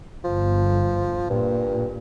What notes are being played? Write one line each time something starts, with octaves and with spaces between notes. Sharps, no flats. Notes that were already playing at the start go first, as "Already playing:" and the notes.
G1 F3
G2 A#2